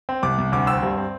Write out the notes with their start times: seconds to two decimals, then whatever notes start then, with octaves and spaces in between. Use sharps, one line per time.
0.09 C4
0.23 C2 D6
0.38 C2
0.52 D2 D6
0.67 C4 E6
0.83 G2
0.98 C4